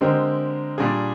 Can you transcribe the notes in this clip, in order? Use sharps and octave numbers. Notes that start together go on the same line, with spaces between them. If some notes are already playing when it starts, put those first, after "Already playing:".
D3 G#3 C4 G4 A#4
A#2 G3 D4 G#4